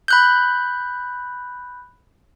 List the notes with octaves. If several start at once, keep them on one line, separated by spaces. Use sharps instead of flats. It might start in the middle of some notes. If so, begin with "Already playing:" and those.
B5 F#6 G6